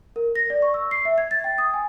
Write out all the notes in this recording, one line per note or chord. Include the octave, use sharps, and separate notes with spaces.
A#4
A#6
D5
C#6
E6
C7
E5
G#6
A6
G5
D#6
G#5